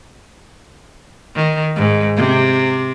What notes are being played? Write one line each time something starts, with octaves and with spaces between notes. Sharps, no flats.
D#3
G#2
C3